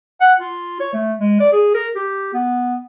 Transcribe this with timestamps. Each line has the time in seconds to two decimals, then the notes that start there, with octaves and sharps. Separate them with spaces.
0.21 F#5
0.39 F4
0.80 C#5
0.93 A3
1.19 G#3
1.40 D5
1.52 G#4
1.74 A#4
1.95 G4
2.34 B3